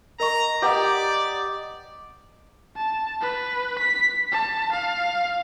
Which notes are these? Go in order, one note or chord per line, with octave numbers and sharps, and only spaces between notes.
A#4 D#5 A#5 C#6
G4 B4 D5 D#5 F#5 A#5
A5
B4
B6
A5
F5